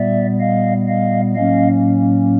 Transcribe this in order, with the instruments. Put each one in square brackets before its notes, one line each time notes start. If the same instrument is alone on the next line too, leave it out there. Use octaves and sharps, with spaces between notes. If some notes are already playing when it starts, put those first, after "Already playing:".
Already playing: [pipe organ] A#2 G3 B3 D5 E5
D#5 F5
D#5 F5
A2 F#3 A#3 C#4 D#5 F5